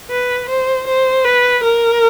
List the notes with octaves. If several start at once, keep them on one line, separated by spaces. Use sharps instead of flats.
B4
C5
C5
B4
A#4